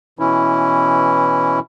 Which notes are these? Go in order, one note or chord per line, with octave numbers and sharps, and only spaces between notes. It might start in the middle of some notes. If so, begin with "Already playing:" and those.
B2 E3 C#4 E4